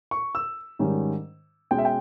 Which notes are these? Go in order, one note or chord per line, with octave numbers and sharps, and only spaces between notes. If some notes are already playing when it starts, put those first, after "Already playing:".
C#6
E6
G#2 D#3 G3 C#4
B2 G#3 C#4 G5
E5
G5